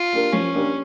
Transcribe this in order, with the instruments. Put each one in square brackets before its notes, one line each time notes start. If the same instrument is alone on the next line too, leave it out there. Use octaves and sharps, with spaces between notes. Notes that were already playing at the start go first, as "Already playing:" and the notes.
Already playing: [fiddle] F4
[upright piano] A#3 D4 G4 A#4
[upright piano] F3 [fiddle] C#4
[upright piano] A#3 D4 G4 A#4